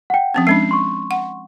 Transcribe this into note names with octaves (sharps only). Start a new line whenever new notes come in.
F#5 G5
F3 C4 C#4
G#3 C#4 D4 C7
C6 C#6
F#5